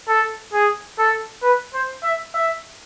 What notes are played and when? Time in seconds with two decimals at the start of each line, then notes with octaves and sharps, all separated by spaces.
0.08 A4
0.53 G#4
0.99 A4
1.43 B4
1.74 C5
2.03 E5
2.34 E5